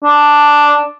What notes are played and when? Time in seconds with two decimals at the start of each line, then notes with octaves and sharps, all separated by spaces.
0.03 D4